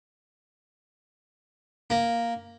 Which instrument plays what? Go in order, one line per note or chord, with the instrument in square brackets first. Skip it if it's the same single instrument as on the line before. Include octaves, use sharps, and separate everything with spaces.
[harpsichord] A#3